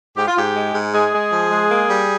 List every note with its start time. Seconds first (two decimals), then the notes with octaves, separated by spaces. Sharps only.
0.16 G#2 G4
0.28 F4
0.36 G#2 G4
0.55 G#3
0.74 G#2
0.93 G#3 G#4
1.13 G#3
1.32 F3
1.51 G#3
1.70 A#3
1.89 G3